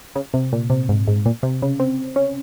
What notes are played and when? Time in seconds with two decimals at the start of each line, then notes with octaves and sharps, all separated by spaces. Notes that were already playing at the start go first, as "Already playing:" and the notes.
0.15 C#3
0.34 C3
0.53 A#2
0.70 C3
0.89 G#2
1.08 G#2
1.26 A#2
1.43 C3
1.62 C#3
1.80 C4
2.16 C#4